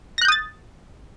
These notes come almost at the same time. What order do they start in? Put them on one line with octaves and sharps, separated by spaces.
A#6 F#6 G6 D#6 A6